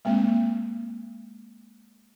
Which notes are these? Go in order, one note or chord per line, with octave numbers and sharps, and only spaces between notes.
G#3 A#3 C4